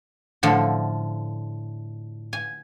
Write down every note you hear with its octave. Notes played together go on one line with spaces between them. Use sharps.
A2 D3 F3
G#5